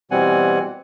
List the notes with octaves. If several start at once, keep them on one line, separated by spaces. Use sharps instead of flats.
B2 E3 G3 C4 F#5 G#5